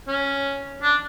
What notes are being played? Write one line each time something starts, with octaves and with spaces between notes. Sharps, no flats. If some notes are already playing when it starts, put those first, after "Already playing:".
C#4
D4